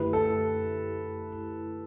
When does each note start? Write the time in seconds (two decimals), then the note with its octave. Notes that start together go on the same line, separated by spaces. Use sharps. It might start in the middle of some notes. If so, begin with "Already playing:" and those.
Already playing: F#2 D3 A3 E4 G4 B4
0.13 A4